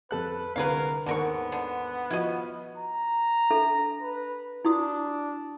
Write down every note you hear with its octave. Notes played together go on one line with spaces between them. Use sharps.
F2 A4 B4 F#6
C2 D3 G#3 A#4 B4 C#5 F5
D#2 G#2 D3 B3 A#4 C#6
D3
F3 E4 F#4 D#5
A#5
D4 A4 E5
B4
D4 E4 F#4 D#6